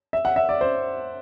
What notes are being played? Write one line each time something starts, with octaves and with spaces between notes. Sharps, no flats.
E5
F#5
E5
D5
C5